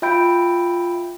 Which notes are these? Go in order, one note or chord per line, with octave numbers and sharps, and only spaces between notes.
F4 E5 G5 B5 G6 D7